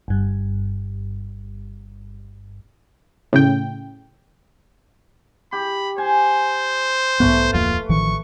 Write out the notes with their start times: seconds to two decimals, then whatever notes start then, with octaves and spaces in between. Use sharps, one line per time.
0.08 G1 G2
3.33 A2 C#3 G5
5.53 G4 B5
5.98 C5 G#5
7.20 B1 G#2 A3 B3 B4
7.53 D1 F2 A#3 F4
7.89 A1 D#3 F3 C#6